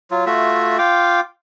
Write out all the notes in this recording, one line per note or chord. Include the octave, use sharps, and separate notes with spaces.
F#3 F4
A3 F4 F#4 E5
F4 F5 G5 D6